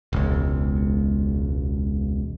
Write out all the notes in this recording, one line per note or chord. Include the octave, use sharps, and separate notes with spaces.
E1 C#2